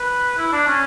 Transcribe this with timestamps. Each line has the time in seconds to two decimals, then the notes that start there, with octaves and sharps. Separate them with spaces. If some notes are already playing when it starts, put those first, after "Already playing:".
Already playing: B4
0.38 E4
0.52 D4
0.67 C#4